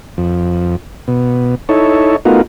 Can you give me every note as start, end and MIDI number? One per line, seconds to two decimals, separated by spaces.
0.18 0.76 41
1.08 1.55 47
1.69 2.16 63
1.69 2.16 64
1.69 2.16 69
1.69 2.16 73
2.25 2.42 57
2.25 2.42 59
2.25 2.42 63
2.25 2.42 65
2.25 2.42 66
2.25 2.42 70